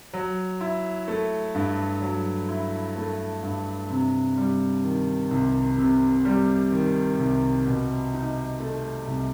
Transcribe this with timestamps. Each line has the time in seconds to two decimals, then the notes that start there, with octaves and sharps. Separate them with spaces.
0.13 F#3
0.61 E4
1.08 A3
1.55 G2
2.02 F#3
2.49 E4
2.96 A3
3.43 G2
3.90 C3
4.37 G3
4.84 D#3
5.31 C2
5.78 C3
6.25 G3
6.72 D#3
7.19 C2
7.66 B2
8.14 D#4
8.60 A3
9.07 C2